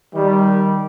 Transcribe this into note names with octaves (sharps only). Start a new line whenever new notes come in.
D#3 G3